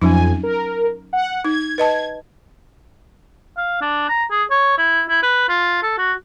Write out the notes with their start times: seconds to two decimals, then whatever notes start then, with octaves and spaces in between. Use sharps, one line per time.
0.02 F2 F#3 C#4 D#4 G#5
0.43 A#4
1.13 F#5
1.44 D#4 G#6
1.78 B4 D#5 A5
3.57 F5
3.81 D4
4.09 A#5
4.31 G#4
4.51 C#5
4.78 E4
5.09 E4
5.23 B4
5.49 F4
5.83 A4
5.98 F#4